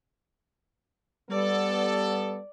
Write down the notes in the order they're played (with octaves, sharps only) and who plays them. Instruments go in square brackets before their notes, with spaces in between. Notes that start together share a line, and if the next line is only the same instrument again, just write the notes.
[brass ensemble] G3 B3 A4 [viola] D5